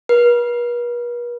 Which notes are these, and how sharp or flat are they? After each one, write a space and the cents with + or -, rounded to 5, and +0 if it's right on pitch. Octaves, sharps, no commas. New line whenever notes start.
B4 -45